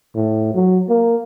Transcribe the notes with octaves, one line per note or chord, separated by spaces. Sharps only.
A2
F#3
A#3